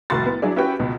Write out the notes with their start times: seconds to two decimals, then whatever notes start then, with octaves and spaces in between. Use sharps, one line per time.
0.10 F1 C2 A2 F#4 C6 A6
0.26 B3
0.42 F#3 D4 E4 G#4 D5
0.56 C#4 E4 F#4 G4 B4 G5
0.79 C#2 B2